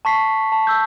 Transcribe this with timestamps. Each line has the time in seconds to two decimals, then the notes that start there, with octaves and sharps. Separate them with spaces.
0.05 A5 C#6 B6 C7
0.52 A5
0.67 E6 G6